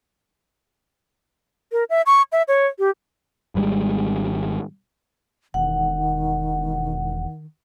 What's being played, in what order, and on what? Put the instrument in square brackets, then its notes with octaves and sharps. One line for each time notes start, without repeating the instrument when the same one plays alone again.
[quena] A#4
E5
C#6
E5
C#5
G4
[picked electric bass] G#1 G3 G#3
[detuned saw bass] E1 [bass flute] D#3 [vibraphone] F#5